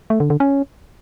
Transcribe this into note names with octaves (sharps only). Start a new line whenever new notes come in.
A3
D3
D3
C#4